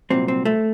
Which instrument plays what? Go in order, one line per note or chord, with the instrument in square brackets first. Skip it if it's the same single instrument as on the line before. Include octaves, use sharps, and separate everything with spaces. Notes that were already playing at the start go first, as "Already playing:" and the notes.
[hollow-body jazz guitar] C2 A#2 F#3 C4
C4
A3